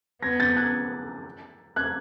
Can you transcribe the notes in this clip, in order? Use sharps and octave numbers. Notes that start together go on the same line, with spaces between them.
B3 G#6 A#6
G6 A6
F#6 G#6
F#6 G#6